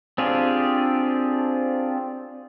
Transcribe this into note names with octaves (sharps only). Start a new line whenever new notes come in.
C4 D4 F4 G4 G#4